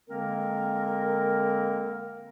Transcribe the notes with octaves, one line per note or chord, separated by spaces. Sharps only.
D3 G#3 A#3 C4 A#4